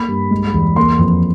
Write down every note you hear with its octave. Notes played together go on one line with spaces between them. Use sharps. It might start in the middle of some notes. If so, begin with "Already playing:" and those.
Already playing: A#3 B5
G2
G#3
E2
A#3 C6
F2